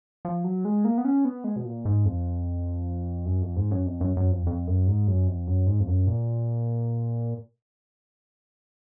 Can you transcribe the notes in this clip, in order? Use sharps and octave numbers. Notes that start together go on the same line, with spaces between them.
F3
F#3
G#3
A#3
B3
C#4
B3
G#3
B2
A#2
G#2
F2
F#2
F2
G#2
F#2
F2
F#2
F#2
F2
F2
F#2
G#2
F#2
F2
F#2
G#2
F2
F#2
A#2